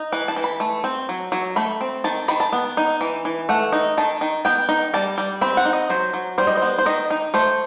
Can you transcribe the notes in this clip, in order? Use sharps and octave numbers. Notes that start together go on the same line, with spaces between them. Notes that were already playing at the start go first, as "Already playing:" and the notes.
Already playing: D#4
E3 B4
A5
E3
B5
A3
C4
F#3
F#3
A3 B5
C4
D#3 A5
D#3 B5
A5
B3
D#4
E3
E3
A3 F#5
D#4
D#3 A5
D#3
B3 G5
D#4
G3 A5
G3
C4 B5
F#5
D#4
D#5
F#3 C5
F#3
G3 C5
D#5
B3 C5
C5
D#3 D#5
D#4
A3 C5